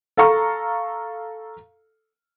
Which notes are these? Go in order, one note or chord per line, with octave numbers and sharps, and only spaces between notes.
A4 F5 A#5 C#6